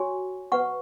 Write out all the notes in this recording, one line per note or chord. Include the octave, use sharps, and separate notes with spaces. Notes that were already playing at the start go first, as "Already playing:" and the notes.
Already playing: F#4 C#5 G#5 C#6
B4 F#5 C#6